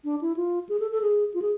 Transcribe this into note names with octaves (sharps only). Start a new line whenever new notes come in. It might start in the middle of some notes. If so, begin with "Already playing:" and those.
D4
E4
F4
G#4
A4
A4
G#4
F4
G#4